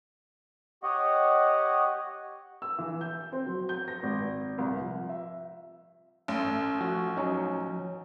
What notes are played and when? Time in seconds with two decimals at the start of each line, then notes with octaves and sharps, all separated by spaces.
0.83 G4 C#5 D#5 F#5
2.62 E6
2.78 E3
3.01 G6
3.32 C4
3.46 F#3
3.69 G6
3.88 A#6
4.03 G#1
4.58 C2
4.80 F3
5.09 E5
6.28 A1 C#4
6.81 F3 F#4
7.17 F#3 C#4 D#4